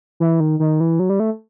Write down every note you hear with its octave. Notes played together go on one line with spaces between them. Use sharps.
E3
D#3
D#3
E3
F#3
G3
A3